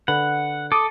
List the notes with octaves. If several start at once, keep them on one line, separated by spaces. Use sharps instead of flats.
D3 B4 F#5
A4 D6 D#6